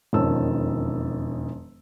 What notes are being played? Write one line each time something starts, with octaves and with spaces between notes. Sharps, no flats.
E1 F2 D#3 C#4 A5 E6